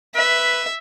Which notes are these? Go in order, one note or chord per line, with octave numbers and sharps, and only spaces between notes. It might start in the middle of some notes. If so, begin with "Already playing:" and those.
B4 E5